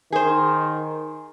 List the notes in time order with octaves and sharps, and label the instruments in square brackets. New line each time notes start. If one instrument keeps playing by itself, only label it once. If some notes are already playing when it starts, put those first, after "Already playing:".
[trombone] D#3 [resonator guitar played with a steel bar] G#4 C5